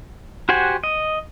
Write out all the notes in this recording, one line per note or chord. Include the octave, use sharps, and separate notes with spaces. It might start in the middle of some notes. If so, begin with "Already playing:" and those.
F#4 G4 C5 F#5 G#5
D#5